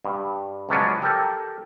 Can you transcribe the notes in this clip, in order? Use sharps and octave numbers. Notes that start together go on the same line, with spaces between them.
G2
C#2 F3 F#3 B3 C#4 D4
G4 A4 A#4 G5